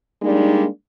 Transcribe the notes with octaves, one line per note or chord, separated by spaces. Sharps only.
G3 G#3 A#3 D4 D#4